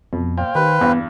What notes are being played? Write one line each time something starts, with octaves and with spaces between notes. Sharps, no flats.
F2 B2
A#2 C5 F5 G5
D#3 G4 B4
E2 G2 B3